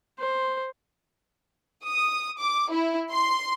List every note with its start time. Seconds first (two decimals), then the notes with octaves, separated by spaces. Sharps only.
0.19 C5
1.85 D#6
2.39 D6
2.70 E4
3.11 C6